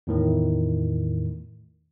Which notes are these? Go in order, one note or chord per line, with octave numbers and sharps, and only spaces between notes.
E2 A2 D#3